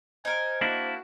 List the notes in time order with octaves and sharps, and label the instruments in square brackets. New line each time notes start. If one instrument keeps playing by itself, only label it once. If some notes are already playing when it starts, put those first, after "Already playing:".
[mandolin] D#4 A#4 [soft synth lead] C5 [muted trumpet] G#5
[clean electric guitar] A#3 D4 E4 [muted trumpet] F#4